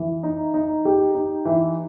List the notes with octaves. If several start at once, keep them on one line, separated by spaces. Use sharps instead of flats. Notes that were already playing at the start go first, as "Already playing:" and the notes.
Already playing: E3
D#4
D#4
G4
D#4
E3